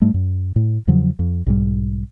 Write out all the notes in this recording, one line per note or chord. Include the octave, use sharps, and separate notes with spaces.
G#2 G3 A3
F#2
A2
E2 C#3 F3 F#3
F2
B1 G#2 G3